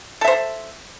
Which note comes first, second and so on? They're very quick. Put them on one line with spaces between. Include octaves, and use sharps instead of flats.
A4 E5 C5